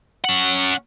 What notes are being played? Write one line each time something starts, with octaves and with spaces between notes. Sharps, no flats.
C#4 F#5